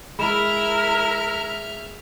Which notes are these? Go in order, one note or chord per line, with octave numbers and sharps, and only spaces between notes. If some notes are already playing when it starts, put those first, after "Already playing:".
G#3 E4 A#4 E5 B5 F6 E7